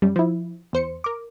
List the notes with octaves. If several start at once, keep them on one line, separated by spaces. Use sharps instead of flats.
F#2 G3
F3 E4
E2 C5 C#7
A#4 D6